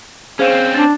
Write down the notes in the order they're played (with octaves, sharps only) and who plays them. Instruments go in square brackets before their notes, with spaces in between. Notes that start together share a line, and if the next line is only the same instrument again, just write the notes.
[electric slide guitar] C4 C#4 [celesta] G#4 C5 F5
[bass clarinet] D4 [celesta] A6